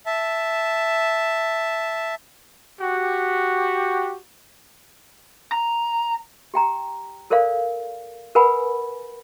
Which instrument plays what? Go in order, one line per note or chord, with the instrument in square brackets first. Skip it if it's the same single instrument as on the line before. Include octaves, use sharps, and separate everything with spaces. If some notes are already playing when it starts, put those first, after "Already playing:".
[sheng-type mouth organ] E5 A5
[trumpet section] F#4 G4
[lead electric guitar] A#5
[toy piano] G4 G5 A#5
A4 A#4 C5 D5 F5
A#4 B4 F#5 G#5 B5